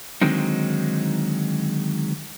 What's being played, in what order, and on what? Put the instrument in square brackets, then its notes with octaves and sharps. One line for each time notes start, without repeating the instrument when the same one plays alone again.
[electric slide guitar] D3 D#3 F#3 G#3 C4 D#4